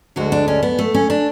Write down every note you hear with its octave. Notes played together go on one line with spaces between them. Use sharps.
D2 D3 G#3 F#4
D4
C#4
B3
A3
C#4
D4